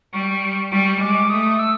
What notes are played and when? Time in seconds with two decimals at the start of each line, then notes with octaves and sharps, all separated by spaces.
0.13 G3 C#6
0.72 G3 C#6
1.01 G#3 D6
1.30 A3 D#6
1.59 E6